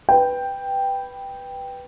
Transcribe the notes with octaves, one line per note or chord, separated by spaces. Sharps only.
B4 G5